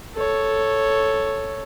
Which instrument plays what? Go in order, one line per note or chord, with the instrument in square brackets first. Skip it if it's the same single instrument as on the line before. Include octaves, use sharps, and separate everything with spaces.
[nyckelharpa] A4 C#5